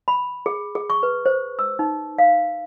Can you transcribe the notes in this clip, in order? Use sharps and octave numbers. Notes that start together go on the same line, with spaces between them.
B5
G#4
G#4
C#6
B4
C5
E6
D#4
F5